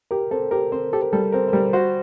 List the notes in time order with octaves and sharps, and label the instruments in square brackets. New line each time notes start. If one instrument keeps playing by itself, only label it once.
[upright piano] G4 [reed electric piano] A#4
[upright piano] C4 [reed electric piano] A4
[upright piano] G4 [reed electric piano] A#4
[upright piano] C4 [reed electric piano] C5
[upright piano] G4 [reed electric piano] A4
[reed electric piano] A#4
[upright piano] G3 [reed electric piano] A4
[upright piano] C4 [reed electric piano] A#4
[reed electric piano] C5
[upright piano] G3 [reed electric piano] A#4
[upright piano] F#4 [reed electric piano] C5